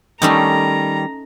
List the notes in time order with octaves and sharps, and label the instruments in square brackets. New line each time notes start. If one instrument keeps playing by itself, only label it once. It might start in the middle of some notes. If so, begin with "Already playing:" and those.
[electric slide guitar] D#3 G3 [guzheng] A3 C#4 D#4 [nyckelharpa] A#5